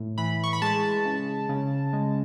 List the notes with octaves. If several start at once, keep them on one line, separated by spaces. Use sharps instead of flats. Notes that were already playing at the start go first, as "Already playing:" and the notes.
Already playing: A2
E3 B5
C#6
B5
G#3 A5
C#3
C#3
G#3